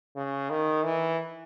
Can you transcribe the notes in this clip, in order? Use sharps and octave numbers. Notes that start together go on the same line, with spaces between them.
C#3
D#3
E3